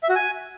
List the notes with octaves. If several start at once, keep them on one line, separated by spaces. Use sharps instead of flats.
E5
F#4
G#5